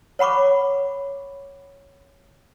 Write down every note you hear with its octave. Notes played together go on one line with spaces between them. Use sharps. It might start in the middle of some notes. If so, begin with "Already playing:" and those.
C#5 F#5 B5 C#6 D6